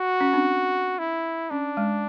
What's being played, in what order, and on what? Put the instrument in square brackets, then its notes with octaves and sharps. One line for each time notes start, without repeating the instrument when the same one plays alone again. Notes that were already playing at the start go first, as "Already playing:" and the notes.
Already playing: [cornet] F#4
[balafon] C#4
C4 D4
[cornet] E4
[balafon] C#4 [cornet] D4
[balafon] G#3